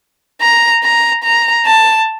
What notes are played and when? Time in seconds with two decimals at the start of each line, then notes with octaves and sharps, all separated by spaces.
0.41 A#5
0.84 A#5
1.24 A#5
1.66 A5